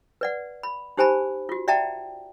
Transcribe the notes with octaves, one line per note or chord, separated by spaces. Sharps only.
B4 D5 F#5
B5
D#4 G4 C5 G#5 A5 B5
F4 F#4
D5 E5 F#5 G5 A5 A#5